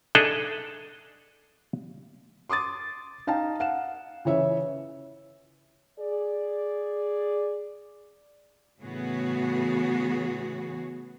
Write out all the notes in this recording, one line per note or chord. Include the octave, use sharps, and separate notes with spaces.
D4 D#4 G#4 A4 D#5 E5
C6 D6 D#6 A6
D#4 F5 G5 A5
F5 F#5 E7
C#3 E3 C#5 E5
G#4 D5
A2 C#3 E3 B3 F#4 G#4